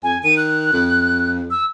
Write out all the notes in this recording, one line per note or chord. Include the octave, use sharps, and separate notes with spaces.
F2 G#5
D#3 D#7
F#6
F2
E6